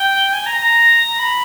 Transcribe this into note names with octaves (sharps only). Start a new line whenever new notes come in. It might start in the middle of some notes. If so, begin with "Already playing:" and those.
Already playing: G5
G#5
A#5
A#5
B5